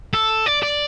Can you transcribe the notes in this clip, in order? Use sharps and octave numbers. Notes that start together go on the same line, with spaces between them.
A4
D5
D5